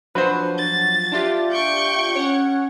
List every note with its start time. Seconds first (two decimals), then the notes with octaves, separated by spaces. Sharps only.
0.15 F3 F#3 D4 F#4 B4 C5
0.58 A6
1.12 D4 F4 G4 E5
1.50 G5 C#6
2.15 C#4 C#5 F#5